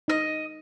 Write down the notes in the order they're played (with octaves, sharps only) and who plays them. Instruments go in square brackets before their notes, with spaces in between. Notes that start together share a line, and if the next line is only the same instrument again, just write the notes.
[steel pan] D#4 [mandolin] D#5